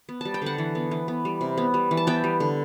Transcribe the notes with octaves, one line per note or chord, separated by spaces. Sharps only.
B3
G3 A5
G5
D3 F#5 A5
E3
B3
E3
B3
G3
C3
B3
G3
E3
A5
B3 E5 G5
G3
D3